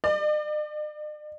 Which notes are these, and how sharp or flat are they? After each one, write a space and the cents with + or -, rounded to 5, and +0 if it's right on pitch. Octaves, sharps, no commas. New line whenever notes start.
D5 +45